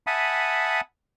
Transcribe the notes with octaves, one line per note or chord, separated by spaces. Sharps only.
E5 F#5 G#5 A5 B5 D#6